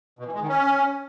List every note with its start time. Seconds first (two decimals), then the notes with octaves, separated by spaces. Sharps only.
0.19 B2
0.26 E3
0.34 G#3
0.41 D#3
0.49 C#4